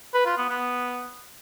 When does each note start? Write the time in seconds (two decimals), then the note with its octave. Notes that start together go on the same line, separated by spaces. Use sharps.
0.14 B4
0.26 F4
0.37 B3
0.49 B3